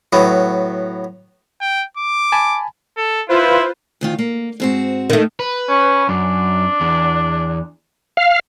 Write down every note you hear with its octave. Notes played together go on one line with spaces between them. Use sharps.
A2 F#3 B3
G5
D6
G#5 A5 B5
A4
E4 F4 B4 C5
D2 D#3 F4
A#3
G#2 C4 F#4
D#3 A3
B4
C#4
F#2 D4
E2
F5